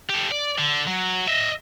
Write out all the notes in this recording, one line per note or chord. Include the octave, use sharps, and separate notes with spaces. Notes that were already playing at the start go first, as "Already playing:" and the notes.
G4 A4
D5
D3
F#3
D#5 E5